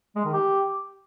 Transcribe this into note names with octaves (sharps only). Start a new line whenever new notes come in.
G#3
D#3
G4